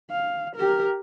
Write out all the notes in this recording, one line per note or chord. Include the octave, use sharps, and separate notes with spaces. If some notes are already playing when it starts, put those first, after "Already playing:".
F5
G4 A#4